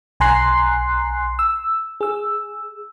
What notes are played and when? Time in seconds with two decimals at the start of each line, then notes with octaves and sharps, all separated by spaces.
0.20 B1 G#5 A#5 C6 F#6 C7
1.39 E6
2.01 G#4 E6